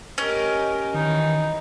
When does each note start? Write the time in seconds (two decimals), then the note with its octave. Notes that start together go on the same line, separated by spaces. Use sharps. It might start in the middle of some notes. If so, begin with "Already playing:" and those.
0.18 C#4 G4 A#4 D#5
0.94 D#3 E3 D#4